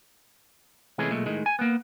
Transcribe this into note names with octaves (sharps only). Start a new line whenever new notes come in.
C3 E3 G#3 A3 C#4 G#4
B1 A#2 G#3 A3
A2 D#3 G#3
G#5
A#3 B3